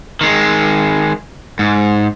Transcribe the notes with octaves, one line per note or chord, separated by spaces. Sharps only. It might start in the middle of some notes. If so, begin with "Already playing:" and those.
D#3 G#3
G#2